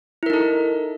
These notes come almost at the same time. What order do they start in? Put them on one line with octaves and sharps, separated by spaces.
E4 A#4 D#4 A4